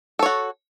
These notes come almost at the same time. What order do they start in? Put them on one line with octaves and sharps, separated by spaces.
A4 C#5 F#4